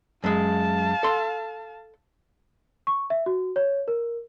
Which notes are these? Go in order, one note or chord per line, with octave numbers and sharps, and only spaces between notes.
F#2 G#3 F5 A5
A4 C6
C#6
E5
F#4
C#5
A#4